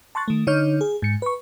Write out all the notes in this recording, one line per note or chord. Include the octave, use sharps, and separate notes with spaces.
A5 C6 C#6 F#6 A6
D#3 A3
D3 D#4 C#5 F6 G6
G#4
G#2 C#7
B4 C#6